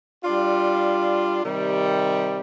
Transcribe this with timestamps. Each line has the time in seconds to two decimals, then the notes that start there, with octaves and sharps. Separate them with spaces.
0.24 G3 D4 F4
1.43 C3 D#3 G3